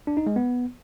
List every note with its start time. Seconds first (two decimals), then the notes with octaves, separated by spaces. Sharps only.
0.07 D4
0.17 D#4
0.27 G#3
0.36 B3